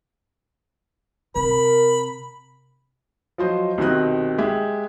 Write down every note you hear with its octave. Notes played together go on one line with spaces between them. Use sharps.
C3 A#4 B5
F3 F#3 C5 D#5
C2 B2 D#3 C4 D#5 F#6
G#3 G4 E5